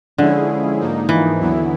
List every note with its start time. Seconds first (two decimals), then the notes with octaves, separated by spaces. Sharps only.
0.18 D3 F3 G#3 C#4 E4 G#4
0.79 G#2 F3 A#3 D#4
1.09 E3
1.39 D#2 D3 F#3 B3 E4